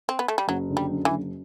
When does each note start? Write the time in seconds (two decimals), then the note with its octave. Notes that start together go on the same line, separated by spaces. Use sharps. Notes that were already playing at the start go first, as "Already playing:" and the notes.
0.09 C4
0.19 B3
0.28 A3
0.38 G3
0.48 F#1 F#3
0.70 D3
0.77 G3
0.91 F#2
1.05 E3
1.12 F#1